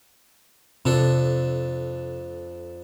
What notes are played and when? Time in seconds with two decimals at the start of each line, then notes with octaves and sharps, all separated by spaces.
0.85 F2 C3 D4 A4